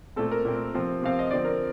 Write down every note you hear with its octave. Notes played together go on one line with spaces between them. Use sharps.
A#2 A3 C4 A4
A#4
A#2 A3 C4
C3 F3 C4
C3 F3 C4 F5
D#5
D3 F3 C4 D5
A#4